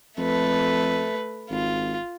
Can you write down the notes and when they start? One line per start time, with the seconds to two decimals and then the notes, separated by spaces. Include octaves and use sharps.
0.17 F2 A3 B4
1.50 G#1 F4